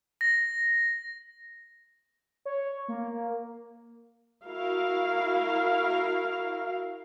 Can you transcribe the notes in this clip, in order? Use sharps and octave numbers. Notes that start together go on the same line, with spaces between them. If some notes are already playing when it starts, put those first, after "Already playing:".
A#6
C#5
A#3
E4 F#4 A#4 F5